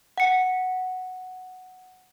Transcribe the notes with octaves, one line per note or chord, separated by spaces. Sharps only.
F#5 C#7